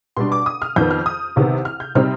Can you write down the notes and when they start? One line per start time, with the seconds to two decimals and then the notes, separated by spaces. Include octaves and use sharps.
0.17 B2 G3 D4 C6
0.32 D6
0.46 D#6
0.62 F6
0.76 F2 D#3 B3 G6
0.91 F6
1.06 D#6
1.36 C2 C3 D#3 B3
1.65 F6
1.80 G6
1.95 C3 G3 C4 D#4 F6